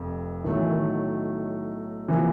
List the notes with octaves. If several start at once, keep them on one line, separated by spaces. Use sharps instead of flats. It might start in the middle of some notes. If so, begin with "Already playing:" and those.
Already playing: F1 F2
B1 A2 D#3 F#3 A3
E3
D#3
C3 E3 F3 A#3